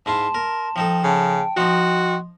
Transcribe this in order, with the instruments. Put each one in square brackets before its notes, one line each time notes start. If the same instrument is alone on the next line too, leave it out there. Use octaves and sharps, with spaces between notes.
[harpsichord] G#2 E4 F4 [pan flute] A5 [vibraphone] C6
[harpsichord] A#4
[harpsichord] F3 D#4 A4 [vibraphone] G5
[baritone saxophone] C#3 [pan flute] G5 [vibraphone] A5
[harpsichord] F3 D#4 [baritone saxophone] F#4 [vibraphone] D#5 C6